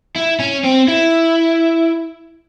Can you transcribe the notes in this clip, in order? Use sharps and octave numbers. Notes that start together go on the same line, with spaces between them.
E4
C#4
C4
E4